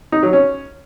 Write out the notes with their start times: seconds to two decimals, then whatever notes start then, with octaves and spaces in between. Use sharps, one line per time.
0.12 D#4
0.23 F#3
0.33 C#4